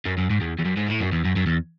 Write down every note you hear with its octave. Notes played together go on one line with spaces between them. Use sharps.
F#2
F#2
G#2
E2
E2
F#2
G#2
A2
F#2
E2
F#2
F#2
E2